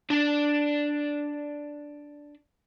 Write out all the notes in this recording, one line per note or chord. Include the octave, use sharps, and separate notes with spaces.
D4 D5